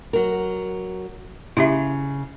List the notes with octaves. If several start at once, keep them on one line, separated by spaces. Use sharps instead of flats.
F#3 A#4
C#3 E4 G4 E5